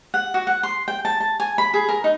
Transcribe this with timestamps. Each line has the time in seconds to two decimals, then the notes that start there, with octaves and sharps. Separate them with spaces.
0.14 F#5
0.34 F#4
0.47 F#5
0.63 C6
0.88 G5
1.05 A5
1.20 A5
1.40 G#5
1.58 B5
1.74 G#4
1.89 A#4
2.04 D#4